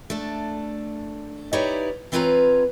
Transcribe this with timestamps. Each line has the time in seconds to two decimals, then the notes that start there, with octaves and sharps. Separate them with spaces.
0.10 A3 D4
1.53 D#4 E4 G4 B4 C#5 D5
2.12 E3 C4 F4 B4 C#5 A#5